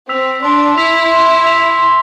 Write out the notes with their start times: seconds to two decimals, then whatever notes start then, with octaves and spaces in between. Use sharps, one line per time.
0.09 C4 E6 B6 F7
0.43 D4 C6
0.77 E4 E6 B6 F7
1.11 C6
1.44 E6 B6 F7
1.78 C6